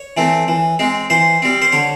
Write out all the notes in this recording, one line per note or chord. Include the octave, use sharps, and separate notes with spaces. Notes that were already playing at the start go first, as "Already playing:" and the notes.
Already playing: C#5
E3 A3 C4
E3
G#3 C4
E3 C5
G3 C4
C5
D3 C#5